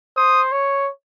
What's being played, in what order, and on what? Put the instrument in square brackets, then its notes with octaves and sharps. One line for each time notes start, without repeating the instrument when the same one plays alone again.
[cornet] C5 [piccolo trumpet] D#6
[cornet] C#5